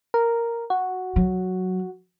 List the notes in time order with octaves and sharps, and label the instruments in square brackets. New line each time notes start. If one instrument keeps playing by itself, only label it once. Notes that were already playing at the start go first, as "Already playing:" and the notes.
[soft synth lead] A#4
F#4
[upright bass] F#3